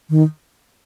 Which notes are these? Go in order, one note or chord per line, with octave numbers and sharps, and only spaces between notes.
D#3